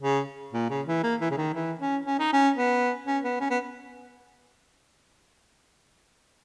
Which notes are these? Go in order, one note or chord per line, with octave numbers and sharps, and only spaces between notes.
C#3
A#2
C#3
E3
A#3
E3
C#3
D#3
E3
C#4
C#4
D#4
C#4
B3
C#4
B3
C#4
B3